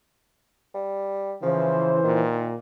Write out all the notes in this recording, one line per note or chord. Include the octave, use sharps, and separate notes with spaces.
G3
C#3 E3 F3 C5
A#2 D#3